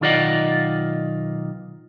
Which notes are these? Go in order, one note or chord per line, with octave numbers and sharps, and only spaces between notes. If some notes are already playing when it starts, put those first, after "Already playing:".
B1 D#3 F4 D5 D#5 F#5